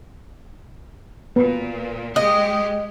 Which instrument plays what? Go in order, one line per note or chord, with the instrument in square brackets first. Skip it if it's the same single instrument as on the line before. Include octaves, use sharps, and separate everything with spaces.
[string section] A#2 [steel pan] B3
[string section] G#3 G4 [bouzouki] D#5